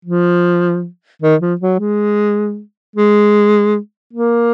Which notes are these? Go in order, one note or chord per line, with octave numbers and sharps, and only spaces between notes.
F3
D#3
F3
F#3
G#3
G#3
A#3